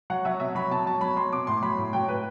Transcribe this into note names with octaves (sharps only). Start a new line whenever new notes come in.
F#3 F#5
F#3 E5
B2 E5
F#3 B5
B2 A5
F#3 A5
F#3 B5
F#3 C6
B2 D6
A2 C6
F#3 B5
A2
F#3 G5
A2 B4